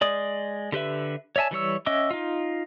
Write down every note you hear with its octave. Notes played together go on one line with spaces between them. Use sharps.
G#3 D5 D#6
D3 G4 B4 E5
C#5 D5 E5 G#5 A5
E3 G3 C#5 E6
C#4 D#5 E5 F#5 D6
D#4 F4